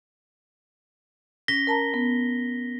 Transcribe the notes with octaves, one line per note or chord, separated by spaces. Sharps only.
C#4 A#6 B6 G7
A#4 A5 A#5
B3